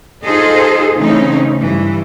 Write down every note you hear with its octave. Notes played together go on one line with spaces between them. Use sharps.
D#4 F4 G#4 A4 C5 D#5
C#3 E3 A3 C4 C#4 D#4
G2 E3